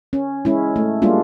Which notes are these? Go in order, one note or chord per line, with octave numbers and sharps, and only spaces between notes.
C#4
G#3 C#4 E4
A3
G3 G#3 A#3 D4 F4